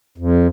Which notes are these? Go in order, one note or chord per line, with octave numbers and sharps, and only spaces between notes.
F2